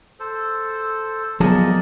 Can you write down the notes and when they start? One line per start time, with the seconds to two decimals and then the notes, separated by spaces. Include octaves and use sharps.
0.20 A4 C5
1.40 F3 F#3 B3 G#4 A#4 D5 D#5 A5